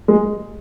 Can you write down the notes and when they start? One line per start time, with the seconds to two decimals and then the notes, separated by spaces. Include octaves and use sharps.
0.08 G#3